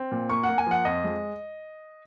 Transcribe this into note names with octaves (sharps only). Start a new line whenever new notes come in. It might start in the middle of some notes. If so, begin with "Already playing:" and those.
Already playing: C4
A#2
A#3 C#6
F#5
A#3
G#5
F3 F#5
F2 D#5
G#3